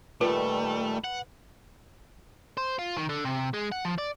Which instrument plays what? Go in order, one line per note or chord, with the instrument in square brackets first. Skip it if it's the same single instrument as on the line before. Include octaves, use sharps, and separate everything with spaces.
[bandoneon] A#2 D#3 G3 [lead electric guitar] A3 [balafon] F4 [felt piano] B4
[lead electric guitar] F#5
[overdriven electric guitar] C5
F4
D#3
D3
C3
G#3
F#5
F3
D5